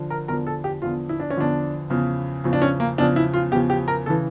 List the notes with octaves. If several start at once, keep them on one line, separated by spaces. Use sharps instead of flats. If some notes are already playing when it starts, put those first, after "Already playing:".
Already playing: D3 F3
A#4
E2 D3 F3 A#4
A4
G4
E2 D3 F3 F4
E4
D4
C#4
E2 D3 F3 D4
E2 C#3 F3
E2 C#3 F3
D4
C#4
A#3
E2 C#3 F3 D4
E4
F4
E2 C#3 F3 G4
G4
A#4
C#3 E3 A4